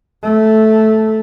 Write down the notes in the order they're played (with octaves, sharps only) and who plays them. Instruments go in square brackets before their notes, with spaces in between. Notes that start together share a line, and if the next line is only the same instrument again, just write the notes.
[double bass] A3